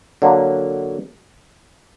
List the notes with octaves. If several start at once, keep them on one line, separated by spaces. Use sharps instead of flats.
D3 F#3 A#3